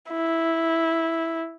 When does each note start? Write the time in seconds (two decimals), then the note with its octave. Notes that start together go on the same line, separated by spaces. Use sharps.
0.11 E4